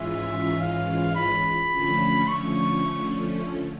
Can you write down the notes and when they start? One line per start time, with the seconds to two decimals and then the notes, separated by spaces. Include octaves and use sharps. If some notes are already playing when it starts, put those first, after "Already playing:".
Already playing: G#2 E3 G#3 C#4 F4 E5
0.60 F5
1.16 B5
1.72 D3 F3 A3 C#4
2.28 C#6